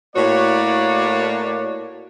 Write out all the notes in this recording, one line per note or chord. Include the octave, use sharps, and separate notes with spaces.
A2 A#3 F#4 C#5 D5